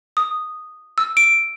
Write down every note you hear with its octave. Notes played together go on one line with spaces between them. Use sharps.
D#6
E6
D7